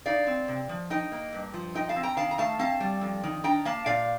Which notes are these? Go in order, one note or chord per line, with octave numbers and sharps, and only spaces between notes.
D#4 D5 F5
C4
C3
F3
D#4 D#5 G5
A#3
G2
F3
D#4 D#5 G5
F5 A5
C4
G5 A#5
D#3 F5 A5
A#5
A3 F5 A5
C4 F5 A5
G3
F2
D#3
D4 G5 A#5
A#3 F5 A5
A#2 D5 F5